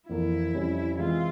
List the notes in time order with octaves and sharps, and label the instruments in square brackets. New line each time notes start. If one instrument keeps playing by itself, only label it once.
[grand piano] F2 E3 A#3 [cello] E4
[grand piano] F2 C3 G3 C#4
[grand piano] E3 G#3 C4 E4 [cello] F4